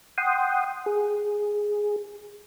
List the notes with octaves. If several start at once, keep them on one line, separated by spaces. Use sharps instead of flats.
F#5 G5 C6 D#6
G#4